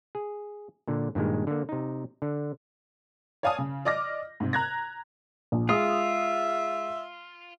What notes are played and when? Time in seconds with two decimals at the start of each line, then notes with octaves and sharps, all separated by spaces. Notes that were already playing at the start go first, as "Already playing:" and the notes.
0.15 G#4
0.88 A#2 D3
1.15 G2 A#2 D#3 G#3
1.47 D3 A#3
1.69 C3 D#4
2.22 D3
3.43 C#5 D5 F5 G#5 A5 D#6
3.58 C#3
3.85 D5 D#5 D6 F6 A#6
4.40 G#2 C3
4.53 A#5 F#6 G#6 A#6
5.52 A#1
5.69 G#3 F4 E5 D#6